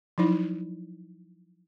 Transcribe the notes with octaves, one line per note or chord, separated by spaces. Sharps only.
F3 F#3 D#4 E4